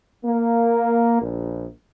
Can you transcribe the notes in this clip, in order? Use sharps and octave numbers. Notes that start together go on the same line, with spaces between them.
A#3
A#1